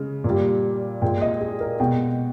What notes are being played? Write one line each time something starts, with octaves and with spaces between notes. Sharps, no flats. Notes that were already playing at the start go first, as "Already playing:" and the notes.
Already playing: C#3 G#3
A#2
G3
A#2 G#3 G5
D#5
G#4
A#4
B2 G#3 G5